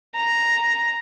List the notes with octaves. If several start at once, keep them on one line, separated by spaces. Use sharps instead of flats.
A#5